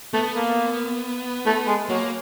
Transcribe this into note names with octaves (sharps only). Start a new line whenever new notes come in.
A3 B3
A#3
A3
G#3
F#3 A#3